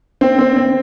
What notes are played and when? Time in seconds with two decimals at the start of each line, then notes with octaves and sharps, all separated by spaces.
0.21 C4
0.39 C4
0.56 C4